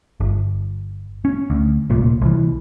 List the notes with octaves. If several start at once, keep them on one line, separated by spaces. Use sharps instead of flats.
G1
C#4
D2
D1 C2 A#2
C2 E3